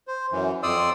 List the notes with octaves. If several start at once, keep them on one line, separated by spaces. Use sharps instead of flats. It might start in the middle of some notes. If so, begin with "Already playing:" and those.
C5
F#2 E3
F2 D5 C6 D#6 E6